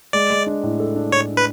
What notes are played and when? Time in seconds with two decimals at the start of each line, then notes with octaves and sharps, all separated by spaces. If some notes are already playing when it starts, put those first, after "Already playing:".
0.13 G#3 D5
0.30 G#3
0.47 D4
0.63 A2
0.80 A4
0.96 D4
1.12 A2 C#5
1.29 D4
1.37 B4